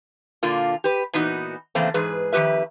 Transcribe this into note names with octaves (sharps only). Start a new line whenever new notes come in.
A#2 D3 A#3 F4
G4 B4
A#2 E3 B3 D#4 F#4
C#3 E3 A3 A#3 C4
G#2 E3 G#4 B4
F2 D#3 G3 G4 B4 E5